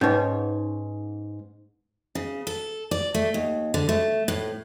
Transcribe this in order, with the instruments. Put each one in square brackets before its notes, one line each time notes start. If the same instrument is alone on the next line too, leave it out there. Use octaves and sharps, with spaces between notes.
[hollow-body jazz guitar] G#2 C#5 [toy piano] C#4 D#4 B4
[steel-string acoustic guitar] C#3
A4
D5
A3
D#2
D3
A3
A2